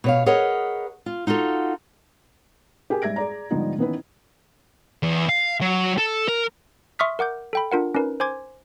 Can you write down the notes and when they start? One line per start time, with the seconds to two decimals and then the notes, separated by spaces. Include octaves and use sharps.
0.04 B2 C#5 F5
0.26 G#4 A#4 B4 C#5 D#5 F#5
1.06 F4
1.27 D#4 F4 F#4 A4
2.90 G4 G#4 A#4 G#5
3.02 G#2 G3 E5 G#6 A#6 D7
3.16 G#4 D5 A#5
3.50 G#2 D3 F3 G3 B3 D#4
3.78 D#3 E3 B3 C#4 E4 B4
5.03 E2
5.29 F5
5.62 F#3
5.98 A4
6.28 A#4
6.99 E5 C6 C#6 D#6 F6 B6
7.19 A#4 F#5 D6 G6
7.53 A4 G5 B5
7.72 D4 F4 A#4 F#5
7.95 C#4 D#4 A#4 B4
8.20 C5 G#5 C6 D6 G#6